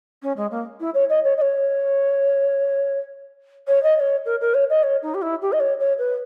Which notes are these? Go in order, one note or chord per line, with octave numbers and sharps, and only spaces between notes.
C#4
G#3
A#3
E4
C#5
D#5
C#5
D#5
C#5
C#5
D#5
D#5
C#5
A#4
A#4
C#5
D#5
C#5
D#4
G4
E4
G4
D#5
C#5
C#5
B4